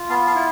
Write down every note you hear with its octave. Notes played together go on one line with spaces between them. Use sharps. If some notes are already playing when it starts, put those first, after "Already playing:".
Already playing: F4
B3 F5 A5
F5 A5
E4